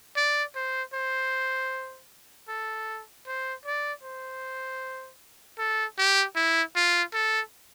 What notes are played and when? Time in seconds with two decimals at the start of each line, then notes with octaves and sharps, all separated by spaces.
0.16 D5
0.55 C5
0.94 C5
2.48 A4
3.27 C5
3.66 D5
4.03 C5
5.58 A4
5.98 G4
6.36 E4
6.76 F4
7.13 A4